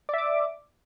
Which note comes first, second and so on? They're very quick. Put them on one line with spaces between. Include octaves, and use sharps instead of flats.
D5 E5 D6